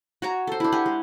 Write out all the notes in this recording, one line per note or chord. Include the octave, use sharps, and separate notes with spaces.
F#4 C#5 A#5
A4 C5
D4 E4
G4 F#5 G#5
G#3